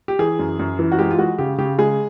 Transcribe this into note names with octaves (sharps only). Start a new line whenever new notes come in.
G4
E3 G#4
F#2
F#2
E3
F#4
G#3 G4
F4
G#3 F#4
C#3 G4
C#3 G4
G#3 G#4